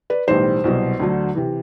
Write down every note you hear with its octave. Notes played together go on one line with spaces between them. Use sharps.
B4 D5
B1 A2 E3 G3 C5
C2 B2 F#3
D2 D3 F#3
C3 E3